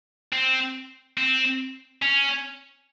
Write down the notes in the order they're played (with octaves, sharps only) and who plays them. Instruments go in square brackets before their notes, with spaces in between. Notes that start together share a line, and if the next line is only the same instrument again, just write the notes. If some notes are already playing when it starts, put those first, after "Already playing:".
[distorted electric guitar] C4
C4
C#4